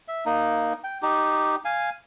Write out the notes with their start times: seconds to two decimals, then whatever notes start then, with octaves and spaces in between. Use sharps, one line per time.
0.08 E5
0.26 A#3 D#4
0.84 G5
1.02 D#4 G4
1.65 F5 G#5